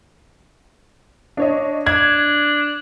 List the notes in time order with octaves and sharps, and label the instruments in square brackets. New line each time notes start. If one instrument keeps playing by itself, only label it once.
[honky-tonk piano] D4 C#5 D#5
[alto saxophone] D4 [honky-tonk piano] G#6